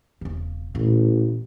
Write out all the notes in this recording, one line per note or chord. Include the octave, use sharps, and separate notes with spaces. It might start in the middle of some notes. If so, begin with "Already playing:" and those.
E1 C#3
A1 A#2